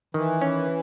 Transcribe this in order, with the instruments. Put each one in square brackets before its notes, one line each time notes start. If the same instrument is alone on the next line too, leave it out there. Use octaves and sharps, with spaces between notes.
[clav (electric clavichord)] D#3 [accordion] E3
[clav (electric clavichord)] C#4